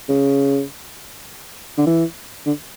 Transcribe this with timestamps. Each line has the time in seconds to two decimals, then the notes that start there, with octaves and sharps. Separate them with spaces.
0.09 C#3
1.78 D3
1.87 E3
2.46 D3